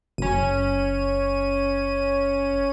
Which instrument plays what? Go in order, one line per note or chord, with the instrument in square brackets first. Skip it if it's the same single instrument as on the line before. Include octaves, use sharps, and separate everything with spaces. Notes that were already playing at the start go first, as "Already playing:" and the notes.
[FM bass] F#1 [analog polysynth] C#4 D#7